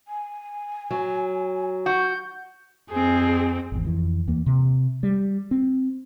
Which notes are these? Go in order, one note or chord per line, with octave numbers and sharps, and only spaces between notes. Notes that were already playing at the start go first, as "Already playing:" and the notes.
G#5
F#3
F#4 G6
F2 C4 G#4
G#1 E2
F2 E3
D#2 E3 A#3
C3
G3
C4